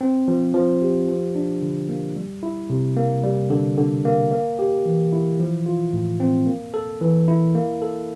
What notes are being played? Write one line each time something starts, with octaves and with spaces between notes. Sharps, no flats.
C4
F3
F3
G4
F3
D4
D3
A#3
G3
E4
C3
A#3
G3
D3
D3
A#3
A#3
G4
E3
E4
F3
F4
A2
C4
A#3
A4
E3
E4
A#3
A4